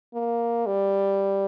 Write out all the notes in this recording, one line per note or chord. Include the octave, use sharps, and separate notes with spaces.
A#3
G3